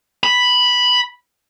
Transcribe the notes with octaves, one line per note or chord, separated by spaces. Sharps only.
B5